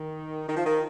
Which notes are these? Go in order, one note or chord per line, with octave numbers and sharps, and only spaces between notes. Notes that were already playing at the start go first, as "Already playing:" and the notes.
Already playing: D#3
D#3
F3
D#3